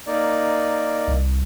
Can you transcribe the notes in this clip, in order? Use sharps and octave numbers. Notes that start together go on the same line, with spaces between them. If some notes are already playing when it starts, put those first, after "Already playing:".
A#3 D#4 D5
C2